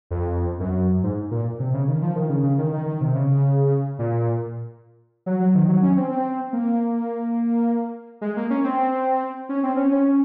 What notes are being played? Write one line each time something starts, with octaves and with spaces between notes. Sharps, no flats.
F2
F#2
G#2
A#2
C3
C#3
D#3
F3
D#3
C#3
C#3
D#3
D#3
D#3
C3
C#3
A#2
F#3
F#3
D#3
F#3
C#4
C4
C4
A#3
G#3
A#3
C#4
C4
C#4
C4
C#4
C#4